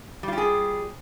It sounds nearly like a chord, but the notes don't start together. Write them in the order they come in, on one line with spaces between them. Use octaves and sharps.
G3 F4 G4 G#4